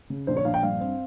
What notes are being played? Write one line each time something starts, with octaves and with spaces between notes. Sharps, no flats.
C#3
A#1 C5
C#5
A#1 F5
G5
G2 F5
C4